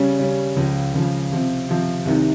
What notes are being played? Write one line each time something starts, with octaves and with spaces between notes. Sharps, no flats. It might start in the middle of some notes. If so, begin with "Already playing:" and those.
Already playing: C#3 G3 C#4
C#3 G3 C#4
C#2 C#3 F3
C#2 C#3 F3
C3 F3 C4
C3 F3 C4
C2 C3 D#3